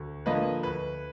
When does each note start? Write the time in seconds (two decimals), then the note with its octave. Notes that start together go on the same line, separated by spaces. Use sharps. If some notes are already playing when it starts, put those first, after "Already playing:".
Already playing: D2
0.26 D3 F3 A#3 B4 D#5
0.63 D2 B4